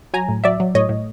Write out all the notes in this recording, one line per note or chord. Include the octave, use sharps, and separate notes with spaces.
F#3 G#5 A#5
A2
F#3 D5 E5
F#3
A2 C#5 D#5
A2